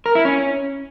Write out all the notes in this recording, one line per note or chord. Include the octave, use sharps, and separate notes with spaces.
A#4
E4
C#4